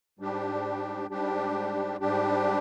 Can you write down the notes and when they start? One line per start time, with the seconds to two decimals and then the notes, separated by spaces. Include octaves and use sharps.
0.19 G#2 G3 D4 G4
1.10 G#2 G3 D4 G4
2.00 G#2 G3 D4 G4